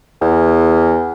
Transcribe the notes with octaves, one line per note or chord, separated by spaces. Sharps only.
E2